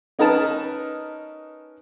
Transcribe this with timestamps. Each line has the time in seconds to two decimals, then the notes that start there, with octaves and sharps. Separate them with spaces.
0.19 C#4 D#4 A#4 B4 A5